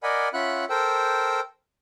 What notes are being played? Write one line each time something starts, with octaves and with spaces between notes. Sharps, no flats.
A#4 D5 D#5 F#5 G#5 B5
C#4 F4 E5 F#5 B5 F#6
A4 A#4 C5 G5 E6